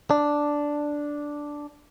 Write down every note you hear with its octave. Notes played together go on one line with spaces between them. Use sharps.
D4